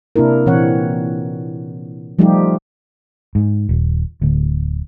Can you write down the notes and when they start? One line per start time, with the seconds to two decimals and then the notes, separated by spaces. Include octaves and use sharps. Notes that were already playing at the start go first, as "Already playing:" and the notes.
0.16 C3 A#3 D4 E4 A#4
0.46 A#2 E3 C4 C#5 F#5
2.19 F3 G3 A3 D#4 F4 G4
3.35 G#2
3.69 D#1
4.21 D1 D2